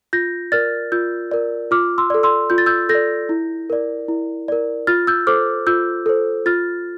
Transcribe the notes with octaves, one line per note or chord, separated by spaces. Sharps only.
F4 G6 A#6
A#4 D5 F6 A6
F4 E6 G6
A#4 D5
F4 D6 F6
C6 E6
A4 D5
C6 E6
F4 G6
A6
E6 G6
A4 G6 A#6
D5
E4
A#4 D5
E4
A#4 D5
F4 F6 A6
E6 G6
A4 C5 D6 F6
F4 E6 G6
A4 C5
F4 F6 A6